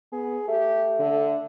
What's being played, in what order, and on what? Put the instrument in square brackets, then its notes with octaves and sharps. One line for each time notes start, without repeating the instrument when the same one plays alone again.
[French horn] B3 [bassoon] G#4
[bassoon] A3 [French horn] G4
[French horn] D3